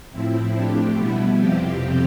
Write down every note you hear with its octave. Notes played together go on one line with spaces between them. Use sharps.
A2 F3 C4 E4
F3 A3 D4 G4
B2 G3 B3 E4
F2 C3 F3 C4 G4